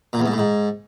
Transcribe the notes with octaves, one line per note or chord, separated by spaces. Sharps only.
A#2
E2
G#2
A2
G#2